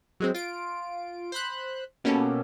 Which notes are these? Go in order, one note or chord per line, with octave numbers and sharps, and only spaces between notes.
F#3 G#3 C4
F4 D7
C5 B5 F#6
B2 A#3 B3 C#4 G4 A4